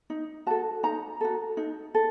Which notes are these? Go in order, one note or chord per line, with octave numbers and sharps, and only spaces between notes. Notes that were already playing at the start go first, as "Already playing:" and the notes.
D#4
F#4 A4 A5
D#4 A#5
F#4 A4
D#4
A4